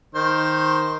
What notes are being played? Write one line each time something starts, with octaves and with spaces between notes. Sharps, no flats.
D#3 C5